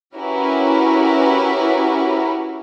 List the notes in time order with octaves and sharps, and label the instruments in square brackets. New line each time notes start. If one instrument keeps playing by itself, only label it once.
[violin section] C#4 E4 F#4 G4 A#4 B4